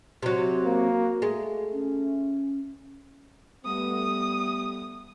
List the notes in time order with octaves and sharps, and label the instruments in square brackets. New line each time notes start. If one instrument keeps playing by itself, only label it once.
[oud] C3 F#3 [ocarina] F#4
[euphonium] A#3
[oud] G#3 [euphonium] A3
[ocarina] C#4
[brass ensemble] G3 A3 B3 [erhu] D#6